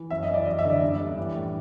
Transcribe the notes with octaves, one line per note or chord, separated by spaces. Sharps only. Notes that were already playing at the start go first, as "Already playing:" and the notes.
Already playing: E3
F#2 E5
D#5
E3
D5
F#2 D#5
E5
D3
D5
G2
G2
E3
A2